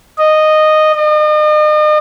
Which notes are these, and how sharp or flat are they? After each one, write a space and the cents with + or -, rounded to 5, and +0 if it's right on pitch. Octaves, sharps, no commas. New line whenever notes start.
D#5 -10
D#5 -40